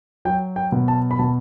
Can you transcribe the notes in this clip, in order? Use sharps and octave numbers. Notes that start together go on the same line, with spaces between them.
F#3 G5
G5
B2
A5
B5
B2 A5